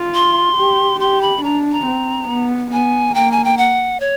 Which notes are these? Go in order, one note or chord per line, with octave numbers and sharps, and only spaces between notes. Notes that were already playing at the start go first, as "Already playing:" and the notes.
Already playing: F4
C6
G4
G4 C6
B5
D4 A#5
A#5
C4
B3
B3 G#5
A#3 G5
G#5
G5
F#5
C#5